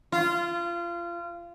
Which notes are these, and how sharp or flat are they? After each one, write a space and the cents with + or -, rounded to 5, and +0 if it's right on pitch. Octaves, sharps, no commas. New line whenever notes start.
F4 -25